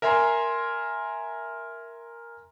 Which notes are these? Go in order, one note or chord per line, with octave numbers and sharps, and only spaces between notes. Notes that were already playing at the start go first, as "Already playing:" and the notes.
A#4 E5 G#5 A#5 C6